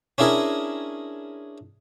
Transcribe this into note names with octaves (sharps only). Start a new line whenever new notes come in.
C#4 D4 E4 G#4 A#4